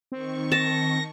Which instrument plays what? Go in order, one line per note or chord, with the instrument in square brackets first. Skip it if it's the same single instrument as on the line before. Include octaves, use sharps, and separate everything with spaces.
[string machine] D#3 C#6 [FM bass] C4
[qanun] A5 [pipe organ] A#6